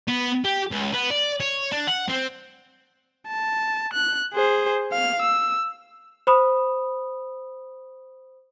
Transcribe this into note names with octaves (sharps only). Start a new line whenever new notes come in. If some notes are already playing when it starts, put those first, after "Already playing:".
B3
G4
C#2
B3
D5
C#5
D4
F#5
C4
A5
F#6
G#4 C5
F5 F6
E6
C5 B5 D#6